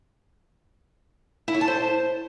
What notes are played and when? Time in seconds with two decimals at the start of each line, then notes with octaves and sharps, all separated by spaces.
1.48 E4
1.54 C#5
1.61 A5
1.68 C5